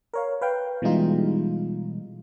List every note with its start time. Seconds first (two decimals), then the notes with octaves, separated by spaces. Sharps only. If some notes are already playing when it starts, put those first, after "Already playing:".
0.13 A#4 C#5 F5
0.41 B4 F5 G5
0.82 B2 E3 G3 G#3 D#4 F4